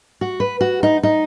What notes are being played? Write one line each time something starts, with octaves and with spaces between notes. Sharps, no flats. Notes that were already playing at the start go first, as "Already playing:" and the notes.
F#4
B4
F#4
D#4
D#4